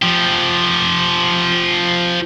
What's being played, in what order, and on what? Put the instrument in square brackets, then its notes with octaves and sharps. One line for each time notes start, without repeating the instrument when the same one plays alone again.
[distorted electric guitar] F3 G4